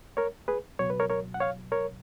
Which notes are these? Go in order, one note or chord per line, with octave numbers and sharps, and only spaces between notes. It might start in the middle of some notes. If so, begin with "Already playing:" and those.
A#4 C#5
G#4 B4
C#2 B2 F#3 C#5
B4
A#4 C#5
A#4 C#5
F#5
C#5 F5
A#4 C#5